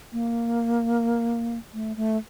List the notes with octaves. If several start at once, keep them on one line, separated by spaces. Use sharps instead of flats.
A#3
A3
A3